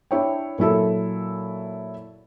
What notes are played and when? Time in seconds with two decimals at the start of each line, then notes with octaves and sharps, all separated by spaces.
0.11 D4 E4 C#5 G5
0.58 A#2 F#3 E4 A4